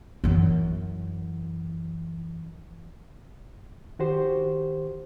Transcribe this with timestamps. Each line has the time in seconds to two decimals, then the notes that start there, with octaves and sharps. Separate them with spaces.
0.24 F#2 E3
3.99 D#3 F#4 G4 C5